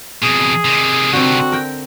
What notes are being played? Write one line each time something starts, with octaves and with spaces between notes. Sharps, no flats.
F2 B2 G#4
C3 D#3
D3 C4 F#4
A#4 G5